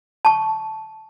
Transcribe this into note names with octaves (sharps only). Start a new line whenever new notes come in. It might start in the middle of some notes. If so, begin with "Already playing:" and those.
A5 C#6